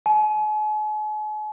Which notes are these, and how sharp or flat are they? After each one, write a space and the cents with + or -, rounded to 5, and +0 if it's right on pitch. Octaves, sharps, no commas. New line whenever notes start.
G#5 +45